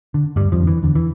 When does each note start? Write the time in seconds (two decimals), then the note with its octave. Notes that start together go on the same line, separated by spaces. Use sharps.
0.14 D3
0.36 D2 G2 G3
0.52 F2 F3
0.60 D3
0.67 E3
0.83 E2 D3
0.96 E3